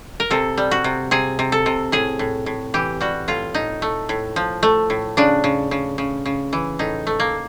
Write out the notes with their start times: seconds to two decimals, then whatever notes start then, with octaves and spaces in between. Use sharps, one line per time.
0.20 A#4
0.30 C3 A4
0.58 G3
0.71 F#4
0.84 C3
1.11 C3 G#4
1.39 C3
1.52 A4
1.66 C3
1.92 A2 G#4
2.19 A2
2.46 A2
2.74 E3 G4
3.01 G3 F#4
3.28 A2 F4
3.54 A2 D#4
3.82 A3
4.09 A2
4.36 F3
4.63 A3
4.90 A2
5.17 C#3 D4
5.44 C#3
5.71 C#3
5.98 C#3
6.26 C#3
6.53 E3
6.79 A2 D#4
7.07 A3
7.20 A#3